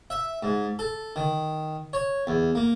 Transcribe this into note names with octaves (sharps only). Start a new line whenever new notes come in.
E5
G#2
A4
D#3
C#5
E2
A#3